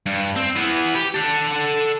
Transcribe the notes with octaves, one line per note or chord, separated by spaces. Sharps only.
G2
C4
E3 B3
G4
A4 F#5